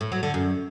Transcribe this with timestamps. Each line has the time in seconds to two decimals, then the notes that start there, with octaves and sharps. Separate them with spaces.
0.01 A2
0.12 F#3
0.23 D3
0.34 F#2